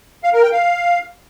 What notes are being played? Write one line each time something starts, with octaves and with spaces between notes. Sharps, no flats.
F5
A#4
G5
F5